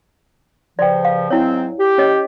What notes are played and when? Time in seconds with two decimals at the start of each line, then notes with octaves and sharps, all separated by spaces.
0.79 G2 C#3 F3 D5 G5
1.05 F5
1.30 G#2 F#3 C4 E4 C#5
1.79 G4
1.98 C#4 C#5 D#5